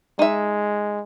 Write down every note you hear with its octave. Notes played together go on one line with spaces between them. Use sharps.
G#3 D#4 E5